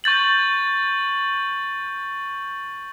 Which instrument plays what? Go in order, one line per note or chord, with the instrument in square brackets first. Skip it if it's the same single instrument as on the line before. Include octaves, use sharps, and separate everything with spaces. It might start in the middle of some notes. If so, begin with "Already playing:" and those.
[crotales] C#6 G6 A6 F#7